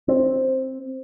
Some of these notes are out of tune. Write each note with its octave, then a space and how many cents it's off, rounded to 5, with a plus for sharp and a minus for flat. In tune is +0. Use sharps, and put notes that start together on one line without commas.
C4 +10